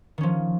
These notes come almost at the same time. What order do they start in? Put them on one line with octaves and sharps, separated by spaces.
D#3 C#4 F3